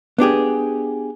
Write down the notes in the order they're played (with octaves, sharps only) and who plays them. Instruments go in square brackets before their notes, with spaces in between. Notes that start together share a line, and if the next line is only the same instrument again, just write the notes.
[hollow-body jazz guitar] B3 D4 G4 G#4